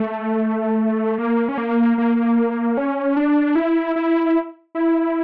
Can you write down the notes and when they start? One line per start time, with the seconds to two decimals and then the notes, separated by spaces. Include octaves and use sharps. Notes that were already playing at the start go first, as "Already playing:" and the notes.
Already playing: A3
1.18 A#3
1.49 C#4
1.58 A#3
1.98 A#3
2.77 C#4
3.17 D4
3.55 E4
3.96 E4
4.75 E4